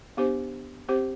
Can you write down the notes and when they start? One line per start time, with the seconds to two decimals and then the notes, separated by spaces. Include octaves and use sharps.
0.17 B3 D4 G4 C5
0.89 C4 G4 C5